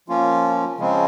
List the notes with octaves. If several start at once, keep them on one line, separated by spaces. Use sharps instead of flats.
F3 A#3 C#4 F4
C#3 F3 G#3 C4